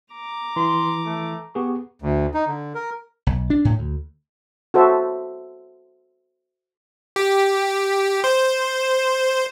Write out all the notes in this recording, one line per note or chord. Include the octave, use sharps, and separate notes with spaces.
A#5 D6
E3 C6
A3
B3 G4 G#4 C#6
D2
D#4
D3
A#4
B1
D4
A2
D2
F#4 A4 C5 E5
G4
C5